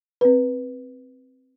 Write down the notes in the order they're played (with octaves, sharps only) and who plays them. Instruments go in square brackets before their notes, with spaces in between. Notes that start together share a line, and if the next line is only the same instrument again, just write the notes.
[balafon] C4 B4